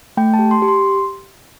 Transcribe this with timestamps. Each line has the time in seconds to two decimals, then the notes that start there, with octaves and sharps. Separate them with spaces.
0.17 A3 G5
0.34 A5
0.39 G4
0.51 C6
0.62 G4
0.68 C6